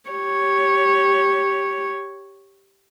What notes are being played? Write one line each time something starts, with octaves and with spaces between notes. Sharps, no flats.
G4 C#5